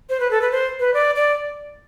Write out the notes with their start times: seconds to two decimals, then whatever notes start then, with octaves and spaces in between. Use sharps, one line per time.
0.10 C5
0.20 B4
0.31 A4
0.42 B4
0.52 C5
0.80 B4
0.94 D5
1.15 D5